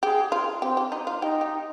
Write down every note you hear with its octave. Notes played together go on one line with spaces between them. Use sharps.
G4 G#4
F4
C4 G4
G4
D#4
F4
D#4 G4
G4